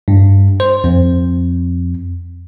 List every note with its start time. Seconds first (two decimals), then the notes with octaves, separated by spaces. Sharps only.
0.08 G2
0.60 C5
0.84 F2